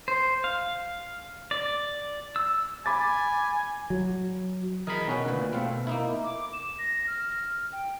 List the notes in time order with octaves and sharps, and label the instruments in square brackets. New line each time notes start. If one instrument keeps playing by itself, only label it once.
[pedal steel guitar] C5
F5
D5
E6
[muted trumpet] G#5 [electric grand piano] B5 D6 A6
[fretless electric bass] F#3
[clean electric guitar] E3 G#4 B5 [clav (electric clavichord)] A#4 D#5
[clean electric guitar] B2 [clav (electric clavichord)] D#3 C#4 F#4
[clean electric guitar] D2 [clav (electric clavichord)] A#2 B4
[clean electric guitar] B2 A3 [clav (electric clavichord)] C4 F5
[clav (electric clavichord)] A#3 D#4 E4
[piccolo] D6
E7
A#6
F6
G5